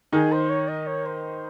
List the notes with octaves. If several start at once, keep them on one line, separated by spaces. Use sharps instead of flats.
D#3 D#4 G#4
C5
C#5
D#5
C#5
C5